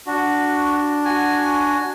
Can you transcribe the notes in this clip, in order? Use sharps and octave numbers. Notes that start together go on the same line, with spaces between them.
D4 F#4
F#4 G#5